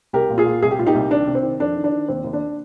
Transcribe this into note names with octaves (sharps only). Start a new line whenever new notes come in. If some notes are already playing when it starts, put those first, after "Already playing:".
C2 G4 A#4
A#2
F4 G#4
A#2
C2 G#4
G4
A#2 F4
D#4 G4
C2
D#3 D4
C3
C4
D#3
F2 D4
D#3
D4
D#3
D#2 C4
D#2
D4